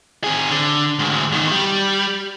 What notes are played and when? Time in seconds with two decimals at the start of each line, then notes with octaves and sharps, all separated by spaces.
0.24 C4 G#4
0.51 D3
0.99 D2 G#2
1.32 E2 D#3
1.52 G3